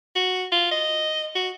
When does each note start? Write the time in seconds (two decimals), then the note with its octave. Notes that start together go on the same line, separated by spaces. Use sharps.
0.16 F#4
0.52 F4
0.71 D#5
1.36 F#4